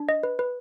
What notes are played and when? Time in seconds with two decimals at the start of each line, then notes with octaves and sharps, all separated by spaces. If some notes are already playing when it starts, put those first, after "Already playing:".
Already playing: D4
0.09 D#5
0.23 B4
0.39 B4